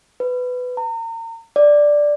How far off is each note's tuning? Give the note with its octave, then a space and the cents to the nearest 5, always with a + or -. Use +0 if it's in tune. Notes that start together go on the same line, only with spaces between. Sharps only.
B4 +15
A#5 -35
D5 +0